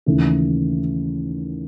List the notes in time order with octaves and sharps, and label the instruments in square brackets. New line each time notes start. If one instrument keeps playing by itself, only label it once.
[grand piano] D#2 C#3 E3 A3